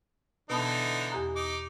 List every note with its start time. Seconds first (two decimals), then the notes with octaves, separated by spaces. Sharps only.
0.50 B2 D3 E3 B3 D#4 A5
1.12 E2 G4 A#5
1.36 D#4 D6